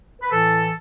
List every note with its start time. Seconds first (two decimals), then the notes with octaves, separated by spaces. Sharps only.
0.21 B4
0.31 A2 E3 A4